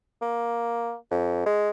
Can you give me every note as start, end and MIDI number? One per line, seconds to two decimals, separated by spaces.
0.22 0.95 58
1.11 1.46 41
1.46 1.70 56